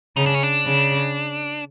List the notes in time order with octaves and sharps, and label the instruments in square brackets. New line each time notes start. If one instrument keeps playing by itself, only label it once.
[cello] C#3 [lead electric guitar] D#4
[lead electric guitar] D4
C#4
D4
[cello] C#3